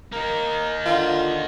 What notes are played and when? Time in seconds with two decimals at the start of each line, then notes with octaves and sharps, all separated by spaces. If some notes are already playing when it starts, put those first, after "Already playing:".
0.12 A#3 D#4 A#4
0.86 D3 D#3 F4